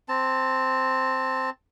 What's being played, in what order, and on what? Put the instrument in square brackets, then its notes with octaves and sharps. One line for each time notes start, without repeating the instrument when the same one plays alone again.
[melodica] C4 A5